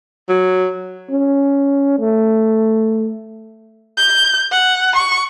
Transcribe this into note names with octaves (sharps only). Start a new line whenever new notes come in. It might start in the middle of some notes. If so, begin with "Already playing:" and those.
F#3
C#4
A3
G6
F#5
C#6